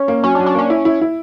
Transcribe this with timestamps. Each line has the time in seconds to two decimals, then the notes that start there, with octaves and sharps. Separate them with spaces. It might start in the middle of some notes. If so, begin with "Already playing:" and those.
Already playing: C#4
0.08 A#3
0.24 F#3 C#4
0.35 D4
0.39 F#3
0.46 D4
0.55 A#3 C#4
0.70 E4
0.85 E4
1.01 E4